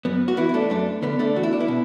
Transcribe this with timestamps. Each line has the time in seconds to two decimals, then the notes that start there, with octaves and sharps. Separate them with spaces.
0.05 F#2 B3
0.28 F#4
0.37 E3 B3 E4
0.49 E4
0.54 A3 D4
0.70 F#2 A3 D4
1.03 D3 B3
1.19 A3 D4
1.36 E2 F#4
1.43 E4
1.53 D4
1.60 B3 E4
1.68 B2